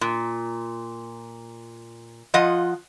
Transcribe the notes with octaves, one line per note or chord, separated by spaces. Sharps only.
A#2
F3 F4 D#5 F#5